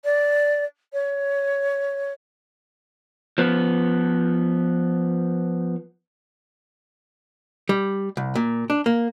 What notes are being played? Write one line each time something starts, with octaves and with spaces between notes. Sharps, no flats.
D5
C#5
F3 B3
G3
C2
A#2
D4
A#3